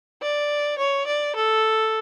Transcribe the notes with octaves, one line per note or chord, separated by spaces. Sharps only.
D5
C#5
D5
A4